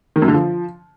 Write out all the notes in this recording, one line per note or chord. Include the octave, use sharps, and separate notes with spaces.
D#3
F#2
D3
F3